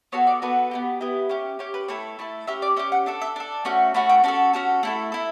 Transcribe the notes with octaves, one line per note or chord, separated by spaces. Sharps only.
B3 F#4 A4 C#5
D5
B3 F#4 A4 B4
B3 E4 G4
B3 E4 G4
C#4 G4
C#4 G4 C#5
B4
A3 E4 A4 C#5
A3 E4 A4
C#4 G4 E5
D5
C#4 G4 E5
F#5
D4 A4 E5
E5
D4 A4
A3 C#4 F#4
A3 C#4 F#4 B5
G5
C#4 F#4 A4 A5
C#4 F#4 A4
A3 E4 A4
E4 A4